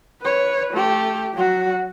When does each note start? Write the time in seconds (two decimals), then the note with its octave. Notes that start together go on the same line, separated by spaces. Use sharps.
0.22 B4 C#5
0.74 A3 G4
1.34 F#3 F#4